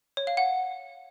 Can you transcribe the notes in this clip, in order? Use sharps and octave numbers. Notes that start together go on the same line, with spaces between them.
C#5
F5
F#5